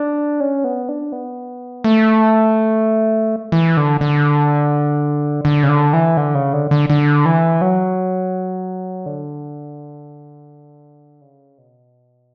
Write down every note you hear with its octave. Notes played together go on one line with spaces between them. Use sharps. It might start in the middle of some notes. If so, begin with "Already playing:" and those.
Already playing: D4
C#4
B3
D4
B3
A3
E3
D3
D3
D3
C#3
D3
E3
D3
C#3
D3
D3
D3
E3
F#3
D3
C#3
B2